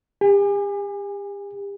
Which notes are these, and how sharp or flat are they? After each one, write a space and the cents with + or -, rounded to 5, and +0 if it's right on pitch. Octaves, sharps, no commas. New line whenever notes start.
G4 +40 G#5 -20